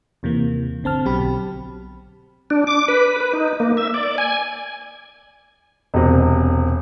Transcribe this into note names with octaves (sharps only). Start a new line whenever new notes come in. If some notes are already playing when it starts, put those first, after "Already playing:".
D#2 C3 E3 A#3
G#1 D3 C4 A5 F6
B1 B2 F#3 C4 G4 B5
D4
D6
B4
B4
D#4
A#3
E5
D5
G#5
E1 C3